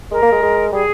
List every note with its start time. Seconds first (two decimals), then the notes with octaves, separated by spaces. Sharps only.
0.11 G#3 A#4
0.22 A#3
0.32 G#3
0.42 G#3
0.73 G3 G#4